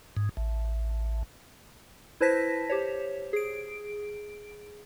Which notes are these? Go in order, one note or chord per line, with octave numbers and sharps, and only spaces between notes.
G#2
A1
E4 B4 C5 A5 A#6 B6
G4 C5 C#5
G#4 D7